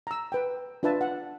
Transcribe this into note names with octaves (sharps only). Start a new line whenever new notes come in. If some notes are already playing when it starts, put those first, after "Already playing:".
A#5 E6
B4 G5
D4 F4 B4 E5 A5
F#5